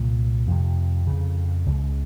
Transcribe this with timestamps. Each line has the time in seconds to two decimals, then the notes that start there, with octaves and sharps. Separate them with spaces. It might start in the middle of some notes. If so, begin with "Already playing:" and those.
Already playing: C2 A#2
0.48 F2 C3
1.07 F2 C#3
1.66 C#2 C#3